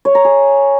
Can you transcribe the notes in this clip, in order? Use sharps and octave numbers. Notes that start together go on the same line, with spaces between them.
C#5
A#5
G#4